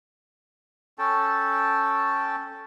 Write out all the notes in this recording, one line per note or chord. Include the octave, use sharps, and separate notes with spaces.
C#4 A4 G5 A5